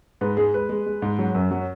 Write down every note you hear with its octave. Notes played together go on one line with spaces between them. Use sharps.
G#2 B4
G#3 G#4
G#3 B4
G#3
G#3
G#2
F#3
F#2
F#3